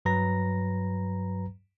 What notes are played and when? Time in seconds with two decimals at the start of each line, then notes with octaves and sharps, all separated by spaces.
0.05 G2 F#3 B4 A#5 A#6